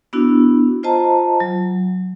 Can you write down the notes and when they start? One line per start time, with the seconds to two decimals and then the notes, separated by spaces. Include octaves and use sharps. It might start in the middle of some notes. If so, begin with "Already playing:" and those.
0.13 B3 D4 E4 F#4
0.83 F4 C5 D#5 A5 A#5
1.40 F#3